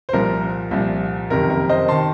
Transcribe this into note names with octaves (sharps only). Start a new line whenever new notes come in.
C5
C2 A#2 F3 A#4
C2 A#2 F3
F#1 F2 C3 D#3 A#4
A#4
C5 D#5
C3 D#3 A5 C6